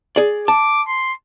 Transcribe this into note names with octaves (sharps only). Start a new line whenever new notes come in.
G#4 D5
A5 D6
C6